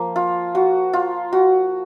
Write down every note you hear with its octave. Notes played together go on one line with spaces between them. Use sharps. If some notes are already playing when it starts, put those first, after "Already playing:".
Already playing: F3 A#3
F4
F#4
F4
F#4